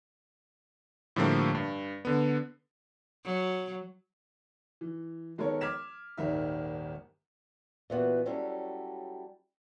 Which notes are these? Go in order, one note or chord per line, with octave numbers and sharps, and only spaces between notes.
A2 D3 F3 G3 A3 A#3
G2
D3 B3
F#3
E3
D#3 G#3 B3 A4 A#4 C#5
D6 F6 G#6 B6 E7
D#1 G#1 D#3 E5
A#2 E3 B3 F#4
F#3 G3 C#4 E4 A4